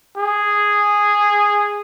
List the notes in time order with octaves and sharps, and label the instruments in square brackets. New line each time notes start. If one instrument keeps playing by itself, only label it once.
[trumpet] G#4